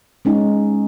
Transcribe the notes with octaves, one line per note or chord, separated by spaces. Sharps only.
G#3 C#4 D#4